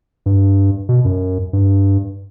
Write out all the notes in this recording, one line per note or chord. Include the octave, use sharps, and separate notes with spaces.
G2
B2
F#2
G2